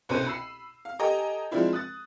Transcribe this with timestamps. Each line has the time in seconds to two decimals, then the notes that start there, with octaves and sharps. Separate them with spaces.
0.09 C2 B2 C#4 A4 C5 D#7
0.27 B5 E6 C7
0.85 F5
0.99 G4 A4 D#5 G5 G#5 A#5
1.51 F3 G#3 C4 D4 E4 F4
1.73 D#6 F#6 A6